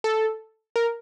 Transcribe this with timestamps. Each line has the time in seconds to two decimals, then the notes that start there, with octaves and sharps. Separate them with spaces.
0.04 A4
0.76 A#4